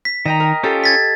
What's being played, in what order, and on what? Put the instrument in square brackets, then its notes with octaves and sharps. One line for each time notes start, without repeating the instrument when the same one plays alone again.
[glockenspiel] B6
[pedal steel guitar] D#3 [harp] D#5 G5 A#5
[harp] A#4
[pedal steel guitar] C#4 F4 [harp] G4 A4 G5
[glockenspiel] G#6 A6 B6